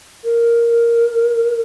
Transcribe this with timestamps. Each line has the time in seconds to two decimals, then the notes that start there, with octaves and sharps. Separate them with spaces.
0.24 A#4